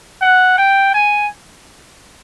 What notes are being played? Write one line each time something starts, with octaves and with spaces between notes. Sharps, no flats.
F#5
G5
G#5